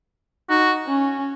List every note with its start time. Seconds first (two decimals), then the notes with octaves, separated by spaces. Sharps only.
0.50 D#4 F#4
0.87 C#4